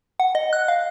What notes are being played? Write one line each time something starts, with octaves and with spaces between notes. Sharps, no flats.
F#5
D#5
F#6
F5